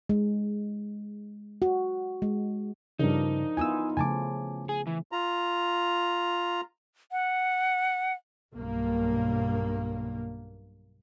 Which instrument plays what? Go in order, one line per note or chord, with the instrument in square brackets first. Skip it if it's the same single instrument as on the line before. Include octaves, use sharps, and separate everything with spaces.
[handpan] G#3
F#4
G#3
[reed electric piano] G2 C#3 [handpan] F3 D4 A#4 [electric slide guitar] D#4
[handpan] B3 E4 F4 [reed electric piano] G#5 D#6 E6
[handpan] C#3 F3 A3 [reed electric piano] G#5 A5 D6
[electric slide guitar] G#4
E3
[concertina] F4 A#5
[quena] F#5
[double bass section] B1 G2 A#3